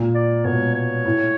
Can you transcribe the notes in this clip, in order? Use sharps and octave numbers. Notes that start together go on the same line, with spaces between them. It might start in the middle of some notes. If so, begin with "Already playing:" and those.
Already playing: A#2
D5
B2 C#5
C#5
A2